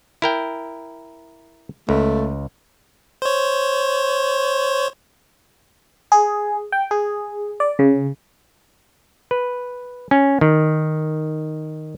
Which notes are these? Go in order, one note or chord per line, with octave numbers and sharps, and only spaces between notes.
E4 A#4 G5
C#2 A3
C5 C#5
G#4
G5
G#4
D5
C#3
B4
C#4
D#3